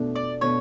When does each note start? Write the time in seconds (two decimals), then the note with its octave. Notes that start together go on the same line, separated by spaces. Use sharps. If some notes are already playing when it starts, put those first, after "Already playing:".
Already playing: B2 A3 D4
0.16 D5
0.41 B2 A3 D4 C#5